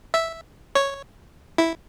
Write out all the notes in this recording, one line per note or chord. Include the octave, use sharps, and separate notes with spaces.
E5
C#5
E4